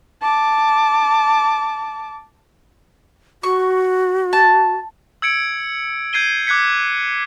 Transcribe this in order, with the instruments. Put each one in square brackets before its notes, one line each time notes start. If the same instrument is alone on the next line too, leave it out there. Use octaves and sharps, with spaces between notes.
[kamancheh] A5 D6
[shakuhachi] F#4 [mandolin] C#6
[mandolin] A5
[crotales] E6 G#6 C#7 D7
G6 G#6 C7 D#7 G7
D6 F#6 G#6 B6 C#7